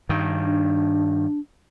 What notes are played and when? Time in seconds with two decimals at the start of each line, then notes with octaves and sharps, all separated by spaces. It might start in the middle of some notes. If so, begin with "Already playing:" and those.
0.09 G2 D#3
0.43 D4